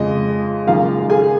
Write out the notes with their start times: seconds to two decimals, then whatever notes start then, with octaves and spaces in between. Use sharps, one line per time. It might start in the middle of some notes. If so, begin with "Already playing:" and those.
Already playing: F2 C#3 G#3 D#5
0.67 F#1 F#2 D#3 G#3 F4 F5
1.10 G#4 G#5